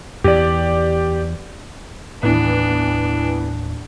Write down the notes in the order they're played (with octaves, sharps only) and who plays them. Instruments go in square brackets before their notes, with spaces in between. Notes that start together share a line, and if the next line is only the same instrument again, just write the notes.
[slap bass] E2 [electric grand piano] G4 D5
[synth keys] D#2 A2 [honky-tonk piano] E3 B3 [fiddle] D4